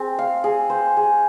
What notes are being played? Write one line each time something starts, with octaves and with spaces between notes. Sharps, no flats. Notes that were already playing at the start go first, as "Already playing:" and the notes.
Already playing: C4 G#4
F5
G#4
C5
G#4